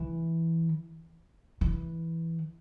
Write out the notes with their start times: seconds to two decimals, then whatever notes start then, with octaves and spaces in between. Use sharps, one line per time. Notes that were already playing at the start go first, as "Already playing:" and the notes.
Already playing: E3
1.61 E3